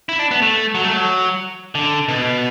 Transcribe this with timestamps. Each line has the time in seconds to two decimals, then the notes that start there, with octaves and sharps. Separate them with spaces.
0.09 E4
0.19 D4
0.31 B3
0.42 A3
0.75 F#3
0.84 A3
0.93 F#3
1.75 D3
2.08 B2